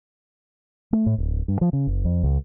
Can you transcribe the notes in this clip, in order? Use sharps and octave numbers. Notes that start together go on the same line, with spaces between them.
A3
A2
D1
G2
F3
C#3
F#1
F2
C#2